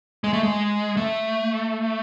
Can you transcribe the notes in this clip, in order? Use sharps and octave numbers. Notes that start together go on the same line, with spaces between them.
G#3
A3
G#3
A3